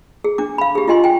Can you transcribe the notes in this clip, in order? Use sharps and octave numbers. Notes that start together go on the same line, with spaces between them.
G#4
D4 D6
F5 B5
G4 G#4
F4 G4 D#5 G#5 C6
G5 G#5